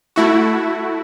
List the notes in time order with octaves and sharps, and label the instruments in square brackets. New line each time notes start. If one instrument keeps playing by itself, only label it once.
[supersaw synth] A3 E4 F#4